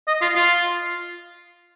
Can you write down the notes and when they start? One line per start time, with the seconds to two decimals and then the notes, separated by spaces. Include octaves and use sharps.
0.08 D#5
0.21 F4
0.36 F4